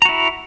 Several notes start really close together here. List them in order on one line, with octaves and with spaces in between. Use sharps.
A#5 F#4 E4